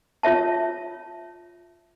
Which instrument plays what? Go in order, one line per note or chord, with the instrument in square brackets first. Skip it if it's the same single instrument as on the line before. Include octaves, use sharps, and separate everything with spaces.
[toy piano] F4 C#5 E5 A5